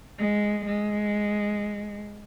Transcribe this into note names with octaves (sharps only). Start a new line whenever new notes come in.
G#3
G#3